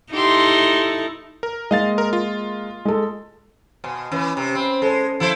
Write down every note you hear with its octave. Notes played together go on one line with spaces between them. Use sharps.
D#4 E4 G4 A4 C6
A#4
G#3 A#3 D#5 F5 A6
A#4
F4
G#3 A4
B2 D#5 G#5 C6
E3 C#4 B4
C3
C4 B5 E7
G#3 A4 C5
F3 E4 A4 C5